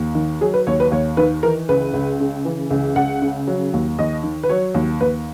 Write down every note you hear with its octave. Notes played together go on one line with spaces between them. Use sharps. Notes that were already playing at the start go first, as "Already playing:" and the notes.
Already playing: D#2
D#3
F#3 G#4
B4
D#2 C#5
B4
D#2 C#5
D#3 B4
E3 A#4
C#2 B4
C#2
C#3
E3
C#2
C#2 F#5
C#3
F#3
D#2
D#2 D#5
D#3
B4
F#3 C#5
D#2
D#2 B4